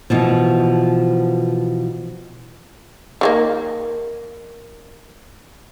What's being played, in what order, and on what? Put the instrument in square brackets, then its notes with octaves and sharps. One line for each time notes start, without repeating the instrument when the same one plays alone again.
[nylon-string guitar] B2 E3 F3
[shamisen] D#3 G#3 A#3